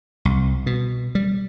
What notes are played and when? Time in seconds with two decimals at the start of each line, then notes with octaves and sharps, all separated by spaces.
0.25 C2
0.66 B2
1.15 G3